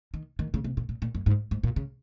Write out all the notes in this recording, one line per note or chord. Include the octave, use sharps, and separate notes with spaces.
D#3
D#3
C#3
C3
A#2
A#2
A#2
F#2
G#2
G#2
A#2
C#3